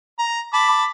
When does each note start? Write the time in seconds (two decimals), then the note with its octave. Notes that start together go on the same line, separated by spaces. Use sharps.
0.19 A#5
0.53 A5 B5 D6